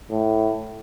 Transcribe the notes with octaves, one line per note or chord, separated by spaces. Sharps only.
A2